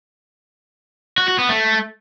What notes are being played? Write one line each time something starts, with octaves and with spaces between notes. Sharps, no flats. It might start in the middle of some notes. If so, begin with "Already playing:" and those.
F#4
F#4
B3
A3